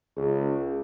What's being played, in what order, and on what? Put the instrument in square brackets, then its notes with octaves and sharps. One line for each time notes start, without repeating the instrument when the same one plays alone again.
[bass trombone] C#2 [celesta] G#4